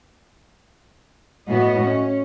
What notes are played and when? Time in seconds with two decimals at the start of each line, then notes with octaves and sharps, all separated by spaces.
1.48 A2 B3 F#4 D#5
1.84 C#4